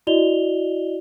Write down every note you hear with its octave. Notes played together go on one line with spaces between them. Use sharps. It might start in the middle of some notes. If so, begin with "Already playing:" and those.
E4 F#4 D5 D#5 F7 G7